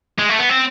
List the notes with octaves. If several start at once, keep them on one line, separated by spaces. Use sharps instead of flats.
G#3
A3
B3
C4